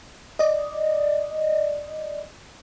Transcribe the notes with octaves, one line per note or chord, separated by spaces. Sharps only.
D5 D#5